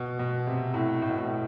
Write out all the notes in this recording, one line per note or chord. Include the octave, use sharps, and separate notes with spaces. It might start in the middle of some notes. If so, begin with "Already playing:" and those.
Already playing: B2
B2
C3
A2
A2
B2
A2